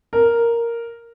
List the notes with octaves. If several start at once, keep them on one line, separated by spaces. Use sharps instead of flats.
A#4